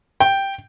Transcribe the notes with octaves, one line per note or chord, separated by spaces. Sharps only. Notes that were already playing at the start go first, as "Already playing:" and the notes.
G5